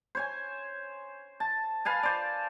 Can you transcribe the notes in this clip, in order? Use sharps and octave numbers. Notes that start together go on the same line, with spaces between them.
C5 C#5 G#5
A5
B4 F5 G#5 A5
C5 D5